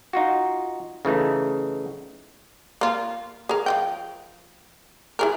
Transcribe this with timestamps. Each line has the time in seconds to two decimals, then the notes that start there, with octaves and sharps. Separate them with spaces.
0.13 D#4 F4 F#4
1.05 C#3 E3 A3 D#4
2.81 A#3 F4
3.49 G#4 A#4
3.66 F3 D#5 G5
5.19 E4 G#4 A#4